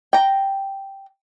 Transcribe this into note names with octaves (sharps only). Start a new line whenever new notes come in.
G5 A#5